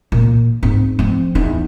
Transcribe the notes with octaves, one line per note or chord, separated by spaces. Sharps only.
A#2
G#2 C4
F3 C4
E2 D#4